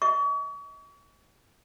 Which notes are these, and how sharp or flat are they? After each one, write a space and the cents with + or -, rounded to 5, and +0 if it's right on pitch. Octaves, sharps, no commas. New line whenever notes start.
D#5 +25 C#6 +40